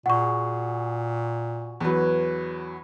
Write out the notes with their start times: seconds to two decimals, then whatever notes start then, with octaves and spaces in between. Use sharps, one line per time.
0.06 A#2 F#4 G#4 F#5 C#6
1.81 E2 F#3 B4 C#5